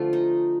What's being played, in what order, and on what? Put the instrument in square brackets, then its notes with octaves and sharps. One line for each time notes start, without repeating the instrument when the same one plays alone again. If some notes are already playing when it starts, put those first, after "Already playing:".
Already playing: [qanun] D3 F3 A3 F4
D#4